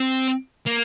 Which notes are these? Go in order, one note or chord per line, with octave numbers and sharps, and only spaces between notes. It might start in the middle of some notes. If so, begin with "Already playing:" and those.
Already playing: C4
A#3